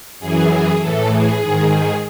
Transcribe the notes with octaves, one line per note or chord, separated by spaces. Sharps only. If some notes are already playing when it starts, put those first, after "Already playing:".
F#2 E3 G#4
A2 E3 A4
G#4
G#2 D#3